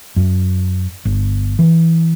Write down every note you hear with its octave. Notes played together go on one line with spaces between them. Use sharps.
F#2
G1
E3